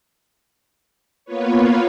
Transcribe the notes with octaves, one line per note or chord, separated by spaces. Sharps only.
A#3 B3 F4 B4 C#5